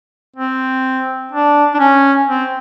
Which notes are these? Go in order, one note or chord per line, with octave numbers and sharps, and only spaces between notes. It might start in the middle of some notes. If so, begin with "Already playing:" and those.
C4
D4
D4
C#4
C4